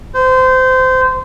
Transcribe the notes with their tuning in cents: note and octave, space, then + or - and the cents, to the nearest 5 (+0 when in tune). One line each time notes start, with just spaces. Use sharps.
C5 -25